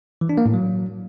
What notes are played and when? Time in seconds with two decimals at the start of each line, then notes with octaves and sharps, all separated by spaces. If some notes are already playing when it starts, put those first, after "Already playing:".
0.21 E3
0.29 D4
0.38 A#3
0.46 A2
0.54 F#3